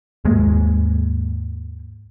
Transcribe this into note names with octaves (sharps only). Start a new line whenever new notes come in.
D#2 G#2 G#3 A#3